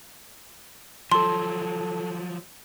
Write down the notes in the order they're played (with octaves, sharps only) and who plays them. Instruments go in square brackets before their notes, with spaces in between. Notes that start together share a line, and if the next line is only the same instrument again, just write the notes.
[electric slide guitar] F3 F#3 [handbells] A4 A5 [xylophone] C6